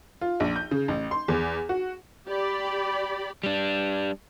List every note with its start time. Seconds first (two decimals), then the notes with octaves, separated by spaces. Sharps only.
0.21 F4
0.40 A#1
0.56 G6
0.71 C#3
0.88 A1
1.11 C6
1.28 E2
1.69 F#4
2.28 G4 D5 B5
3.43 G3 D4